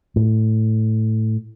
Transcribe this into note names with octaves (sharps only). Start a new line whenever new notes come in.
A2